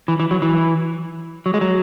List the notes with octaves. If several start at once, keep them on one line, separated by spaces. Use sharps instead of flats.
E3
E3
F#3
E3
F#3
G#3
F#3